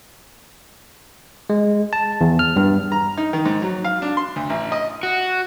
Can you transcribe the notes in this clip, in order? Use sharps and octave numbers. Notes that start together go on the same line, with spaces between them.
G#3
A5
E2
F6
G2
A#5
D#4
D#3
G#2
F#3
F5
D4
C6
D2
A1
D#5
F#4